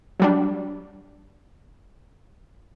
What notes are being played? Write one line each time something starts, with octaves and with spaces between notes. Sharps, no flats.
F#3 G3 D4